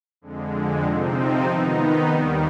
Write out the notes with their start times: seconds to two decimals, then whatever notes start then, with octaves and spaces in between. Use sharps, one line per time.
0.21 F2 D3 G#3
0.84 C3 F3 C4 D#4
1.47 D#3 B3 D#4
2.08 D#2 D#3 G3